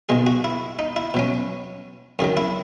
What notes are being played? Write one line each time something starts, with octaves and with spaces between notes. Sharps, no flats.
B1 B2 G#3 G#4
F#4
E4
D#4
E4
B2 F#3 C#4
F#2 D#3 F#3 G#4
E4